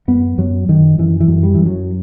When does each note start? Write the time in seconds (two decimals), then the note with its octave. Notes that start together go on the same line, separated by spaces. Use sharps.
0.08 F#2 B3
0.38 F#2 F#3
0.69 F#2 D#3
0.98 F#2 E3
1.20 E3
1.28 F#2
1.43 G3
1.55 F#2 E3
1.66 F#3